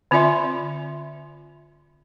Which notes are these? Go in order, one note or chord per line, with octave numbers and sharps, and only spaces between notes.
D3 C4 F4 D5 E5 C6